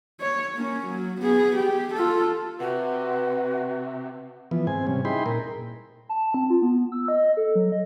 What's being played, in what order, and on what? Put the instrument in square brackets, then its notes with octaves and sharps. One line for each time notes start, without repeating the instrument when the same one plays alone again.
[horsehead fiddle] C#5
A#3 C#4
F#3
B3 G#4
G4
F4 A4
[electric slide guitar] C3 [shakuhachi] F#4 [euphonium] B4 [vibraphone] F#5
[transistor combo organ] E3 F3 B3
G#2 C4 G#5
C3 G3 C#4
D#4 E4 G#4 G5 B5 C6
A#2 A#4
[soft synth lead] A5
C4
F4
B3
E6
D#5
A4
F#3
D#5